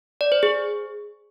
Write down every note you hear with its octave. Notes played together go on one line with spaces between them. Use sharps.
D5
C5
G#4